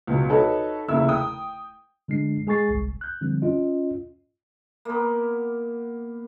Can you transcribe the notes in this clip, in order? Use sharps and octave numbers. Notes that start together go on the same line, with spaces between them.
C#2 B2 F#3
D#4 F#4 A4 B4 C#5
F1 D#2 C#3 E4 E6
G5 D#6
D3 G#3 D4 C7
G#3 G#4 G#5 C#6 A6 C7
G1 C2
F#6 G6
D3 F3 G3 C4
C#4 F4 D#5
A#3 B3